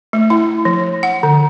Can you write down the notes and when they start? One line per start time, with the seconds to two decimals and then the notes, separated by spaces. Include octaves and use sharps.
0.13 A3
0.30 E4
0.65 F3
1.03 F#5
1.23 D3